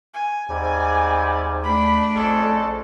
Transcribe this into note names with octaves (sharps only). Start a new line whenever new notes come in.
G#5
D#2 G#2 C3 G3
A3 D4 B5
A#1 F2 C#3 G#3 A4